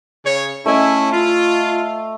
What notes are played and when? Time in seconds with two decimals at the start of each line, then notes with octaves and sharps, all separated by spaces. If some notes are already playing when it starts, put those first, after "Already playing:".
0.25 C#3 C#5
0.66 A3 C#4 E4 D#5
1.12 F4